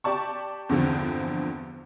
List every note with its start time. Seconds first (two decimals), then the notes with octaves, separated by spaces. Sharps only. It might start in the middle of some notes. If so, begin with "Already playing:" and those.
0.04 G4 D5 A5 C#6
0.69 E2 G2 D3 F3 B3 C4